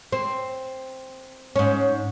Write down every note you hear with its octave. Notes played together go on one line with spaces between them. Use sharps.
C4
G#2 C#4